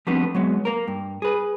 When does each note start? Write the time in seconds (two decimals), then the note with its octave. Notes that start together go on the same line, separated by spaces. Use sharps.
0.07 F3 G3 A3 B3 C4 D4
0.35 F#3 G#3 B3
0.65 A#3 A#4
0.87 G2
1.22 G#4 B4